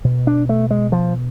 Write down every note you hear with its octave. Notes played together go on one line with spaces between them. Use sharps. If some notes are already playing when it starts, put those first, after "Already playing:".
B2
D4
A3
G#3
F3